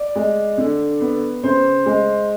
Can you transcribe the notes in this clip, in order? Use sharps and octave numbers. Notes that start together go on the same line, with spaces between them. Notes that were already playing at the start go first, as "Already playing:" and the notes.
Already playing: D5
G#3
D3
B3
C#3 C5
G#3